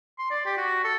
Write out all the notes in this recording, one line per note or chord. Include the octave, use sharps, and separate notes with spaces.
C6
D5
G4
F#4
A4